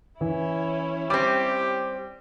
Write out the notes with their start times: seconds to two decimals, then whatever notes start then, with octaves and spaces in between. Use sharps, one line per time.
0.21 E3 C#4 E4
1.10 G3 C4 G4 D6